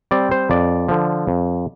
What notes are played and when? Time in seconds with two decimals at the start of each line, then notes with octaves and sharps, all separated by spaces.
0.11 G3 C4 D5
0.31 C5
0.50 F2 D5
0.89 D3 F3
1.27 F2